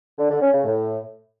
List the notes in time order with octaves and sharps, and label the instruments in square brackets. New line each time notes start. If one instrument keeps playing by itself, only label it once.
[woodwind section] D3
D3
C#4
C#3
A2